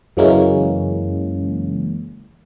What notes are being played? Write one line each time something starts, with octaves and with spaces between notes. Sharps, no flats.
F#2 C#3 E3 G#3 A#3 C#4